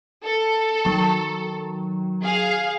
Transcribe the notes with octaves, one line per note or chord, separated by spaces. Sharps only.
A4
D#3 F#3
G#4 F5